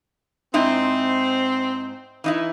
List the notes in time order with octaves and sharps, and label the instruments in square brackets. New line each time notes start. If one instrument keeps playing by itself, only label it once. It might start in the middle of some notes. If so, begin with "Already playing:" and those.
[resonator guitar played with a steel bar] G#2 D#4 E4 [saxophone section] C4
[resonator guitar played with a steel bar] E3 D#4 E4